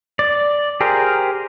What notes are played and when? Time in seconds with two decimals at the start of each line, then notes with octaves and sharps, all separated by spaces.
0.19 D5
0.81 G4 G#4 A#4 C5